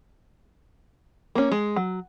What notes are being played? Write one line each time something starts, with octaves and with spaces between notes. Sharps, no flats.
A#3 C#4
G#3
F#3